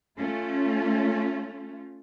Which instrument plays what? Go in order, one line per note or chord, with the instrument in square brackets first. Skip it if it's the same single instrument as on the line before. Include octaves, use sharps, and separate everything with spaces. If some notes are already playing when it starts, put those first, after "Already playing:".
[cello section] A3 C#4 F4